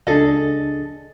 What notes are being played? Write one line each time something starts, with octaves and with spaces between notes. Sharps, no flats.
C#2 D4 G#4 A4 D#5